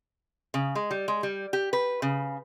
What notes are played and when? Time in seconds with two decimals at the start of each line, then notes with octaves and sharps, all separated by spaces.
0.54 C#3
0.75 G#3
0.91 G3
1.08 G#3
1.23 G3
1.53 G4
1.73 B4
2.02 C#3